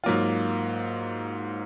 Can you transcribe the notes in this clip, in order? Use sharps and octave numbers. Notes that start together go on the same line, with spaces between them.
G#2 F#3 A#3 F4